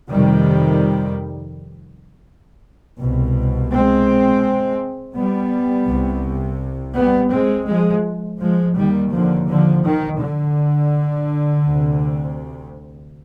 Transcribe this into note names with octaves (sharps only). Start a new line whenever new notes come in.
F2 C3 D#3 G3
C2 B2
G#3 C4
G3 B3
C2 C3
G3 B3
G#3 C4
F3 G#3
F3 G#3
D#2 D#3 G3
D3 F3
D3 F3
D#3
D3
D2 C3